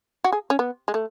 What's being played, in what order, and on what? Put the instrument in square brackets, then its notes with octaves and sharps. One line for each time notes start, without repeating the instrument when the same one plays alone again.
[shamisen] F#4
G#4
C#4
B3
G#3
A3